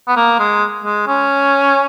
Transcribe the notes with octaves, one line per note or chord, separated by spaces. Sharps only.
B3
A#3
G#3
G#3
C#4